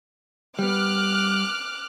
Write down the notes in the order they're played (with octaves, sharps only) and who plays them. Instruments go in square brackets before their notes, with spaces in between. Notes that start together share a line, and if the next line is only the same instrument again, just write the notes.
[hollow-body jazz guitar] G3 B3 [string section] D6 F6 F#6